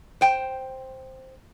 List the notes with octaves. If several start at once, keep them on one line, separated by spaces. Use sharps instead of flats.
C5 G5